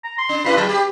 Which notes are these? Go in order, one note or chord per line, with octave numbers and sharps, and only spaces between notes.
A#5
C6
D4
G2 E4 B4 B5
F#3 A5
G4 B5